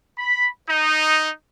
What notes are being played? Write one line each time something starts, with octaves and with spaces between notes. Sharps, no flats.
B5
D#4